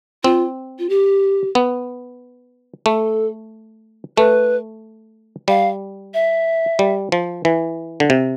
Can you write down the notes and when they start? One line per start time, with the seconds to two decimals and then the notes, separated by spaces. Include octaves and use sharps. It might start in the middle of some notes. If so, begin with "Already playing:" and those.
0.24 C4 F4
0.79 F4
0.89 G4
1.55 B3
2.86 A3 A4
4.17 A3 B4
5.48 G3 F5
6.14 E5
6.79 G3
7.12 F3
7.45 E3
8.00 D3
8.10 C3